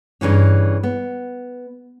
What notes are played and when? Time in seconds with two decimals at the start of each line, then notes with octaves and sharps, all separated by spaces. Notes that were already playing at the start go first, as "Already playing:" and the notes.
0.21 G2 C#3 E3 C#4
0.83 B3